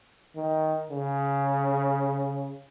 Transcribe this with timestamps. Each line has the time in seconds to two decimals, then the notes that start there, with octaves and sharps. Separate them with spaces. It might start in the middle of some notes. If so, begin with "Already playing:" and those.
0.36 D#3
0.91 C#3